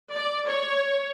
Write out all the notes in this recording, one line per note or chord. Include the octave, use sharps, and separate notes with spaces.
D5
C#5